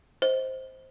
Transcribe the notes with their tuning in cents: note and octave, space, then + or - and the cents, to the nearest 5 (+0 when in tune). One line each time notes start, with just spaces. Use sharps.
C5 +5 D#5 +30